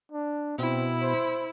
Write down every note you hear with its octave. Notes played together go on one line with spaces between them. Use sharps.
D4
B2 C4 E4
C5